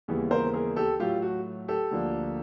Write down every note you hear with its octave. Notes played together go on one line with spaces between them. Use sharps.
D#2 C#3 E3 G3 B3
A#4 C5
G#4 A#4
G4 A4
A2 F#3 A3 F4 G4
F#4
G4 A4
D2 D3 F3 A#3